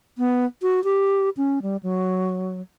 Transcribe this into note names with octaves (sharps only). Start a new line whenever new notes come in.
B3
F#4
G4
C#4
G3
F#3